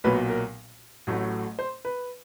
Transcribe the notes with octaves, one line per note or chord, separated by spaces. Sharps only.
B1 A#2 F#3 B4
A#4
A1 A2 F#3 A3
C5
B4